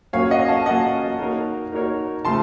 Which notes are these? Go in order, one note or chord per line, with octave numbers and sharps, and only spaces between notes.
A#2 F#3 A#3 C#4 C#5 F5
D#5 F#5
F5 A5
A#2 F#3 A#3 C#4 D#5 F#5
A#3 D#4 F#4 A#4 C#5
A#3 D#4 F#4 A#4 C#5
C#3 F3 A3 A5 C6